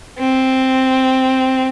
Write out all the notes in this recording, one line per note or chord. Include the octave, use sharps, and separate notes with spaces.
C4